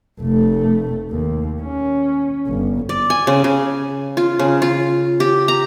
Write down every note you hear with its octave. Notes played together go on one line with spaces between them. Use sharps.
F1 A3
D#2
C#4
G1
D5
G#5
C#3
C#3
F4
C#3
F4
G4
A#5